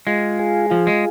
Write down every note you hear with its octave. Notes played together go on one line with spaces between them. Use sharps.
G#3 F4
G#4
F3 F4
G#3